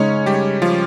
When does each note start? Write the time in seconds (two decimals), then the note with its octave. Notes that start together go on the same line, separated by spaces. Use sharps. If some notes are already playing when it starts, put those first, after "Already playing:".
Already playing: C#3 G#3 C#4 D#4 C#5
0.26 G3 G4
0.62 F3 F4